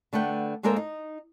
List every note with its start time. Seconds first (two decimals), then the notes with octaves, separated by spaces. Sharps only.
0.13 D3 A3 B4 F#5 G5
0.63 D3 G#3 A#3 A4 A#4 C5
0.76 D#4